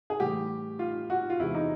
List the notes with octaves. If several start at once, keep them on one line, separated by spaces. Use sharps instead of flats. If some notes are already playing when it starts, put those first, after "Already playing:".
G#4
A2 E3 G3 G4
F4
F#4
F4
E2 C3 E3 G#3 E4
D#4